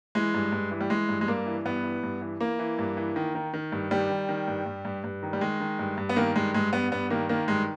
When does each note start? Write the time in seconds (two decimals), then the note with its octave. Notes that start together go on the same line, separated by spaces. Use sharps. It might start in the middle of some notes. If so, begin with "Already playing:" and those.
0.15 E3 G#3
0.34 G2
0.52 G2
0.71 E3
0.81 G3
0.90 E3 G#3
1.09 G2
1.21 G#3
1.28 G2 A#3
1.46 E3
1.65 G2 B3
1.84 E3
2.03 G2
2.22 E3
2.40 E3 A#3
2.59 E3
2.79 G2
2.97 E3
3.16 D#3
3.35 D#3
3.54 D#3
3.72 G2
3.91 D#3 G3
4.10 D#3
4.29 D#3
4.48 G2
4.66 G2
4.85 G2
5.04 G2
5.23 D#3
5.33 G3
5.41 D#3 G#3
5.60 D#3
5.79 G2
5.97 G2
6.09 B3
6.16 D#3 A#3
6.36 G2 G#3
6.54 G2 G#3
6.73 G2 B3
6.92 G2 B3
7.10 D#3 A#3
7.29 D#3 A#3
7.48 G2 G#3